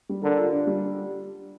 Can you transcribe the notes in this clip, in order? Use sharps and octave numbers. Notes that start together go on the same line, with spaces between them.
G3
D3 A#4
F4
D4
G3